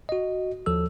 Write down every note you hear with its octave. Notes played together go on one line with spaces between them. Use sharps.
F#4 D#5
D#2 F3 A4 E6